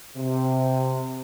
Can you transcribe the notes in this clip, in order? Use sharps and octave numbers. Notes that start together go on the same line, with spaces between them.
C3